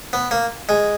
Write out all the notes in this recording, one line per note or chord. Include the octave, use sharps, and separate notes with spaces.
B3
A#3
G#3